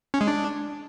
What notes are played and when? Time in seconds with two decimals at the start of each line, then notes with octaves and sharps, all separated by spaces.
0.14 C#4
0.21 G#3
0.28 D4